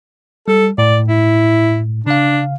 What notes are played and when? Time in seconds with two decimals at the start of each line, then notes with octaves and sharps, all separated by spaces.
0.48 G3 A4
0.78 A2 D5
1.08 E4
2.06 C#3 D4 F5